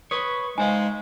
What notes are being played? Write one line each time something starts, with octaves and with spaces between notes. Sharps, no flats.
B4 C#5 C#6 D#6
G#3 D#4 C5 F5 G#5